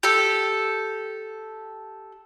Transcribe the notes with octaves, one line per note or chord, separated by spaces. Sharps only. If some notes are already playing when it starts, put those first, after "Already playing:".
G4 A4